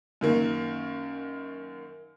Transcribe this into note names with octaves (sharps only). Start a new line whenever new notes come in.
F#2 D#3 A#3